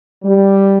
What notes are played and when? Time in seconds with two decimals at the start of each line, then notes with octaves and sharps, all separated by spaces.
0.24 G3